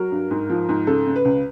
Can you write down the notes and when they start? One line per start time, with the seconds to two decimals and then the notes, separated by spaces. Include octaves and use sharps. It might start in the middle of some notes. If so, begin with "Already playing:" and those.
Already playing: F#3 A#4
0.11 G2
0.31 G#2
0.50 F3
0.69 G#2
0.87 C#3 A4
1.07 C#3
1.16 B4
1.25 C#2